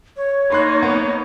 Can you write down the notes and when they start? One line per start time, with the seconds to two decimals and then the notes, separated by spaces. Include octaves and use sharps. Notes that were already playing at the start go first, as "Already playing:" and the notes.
0.17 C#5
0.50 A#3 D#4 B5 C6 F#6
0.83 B3